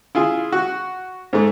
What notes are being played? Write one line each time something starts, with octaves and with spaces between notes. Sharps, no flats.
E4 F4 G#4
F#4
G#2 A3